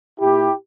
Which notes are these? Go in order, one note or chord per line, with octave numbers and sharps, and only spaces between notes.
A#2 E4 G4